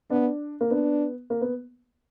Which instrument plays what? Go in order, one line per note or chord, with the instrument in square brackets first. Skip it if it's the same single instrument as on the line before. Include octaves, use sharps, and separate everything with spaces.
[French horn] B3 [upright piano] D4
[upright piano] A#3
[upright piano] B3 [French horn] D4
[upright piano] A#3
B3